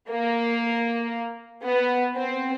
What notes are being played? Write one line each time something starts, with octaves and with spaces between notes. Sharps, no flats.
A#3
B3
C4